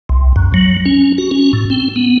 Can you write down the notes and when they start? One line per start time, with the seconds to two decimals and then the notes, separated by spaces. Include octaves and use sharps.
0.09 C2
0.36 F#2
0.54 F#3
0.86 C#4
1.18 F#4
1.31 C#4
1.53 A2
1.70 C4
1.96 B3